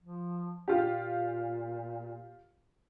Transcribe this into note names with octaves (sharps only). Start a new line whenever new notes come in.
F3
A#2 F4 G4